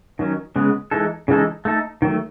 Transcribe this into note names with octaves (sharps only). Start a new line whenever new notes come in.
D#3 F#3 C#4
C#3 G#3 B3
E3 G#3 D#4 A4
C#3 E3 G#3 D#4 A4
A3 D#4 A4
D#3 F#3 A3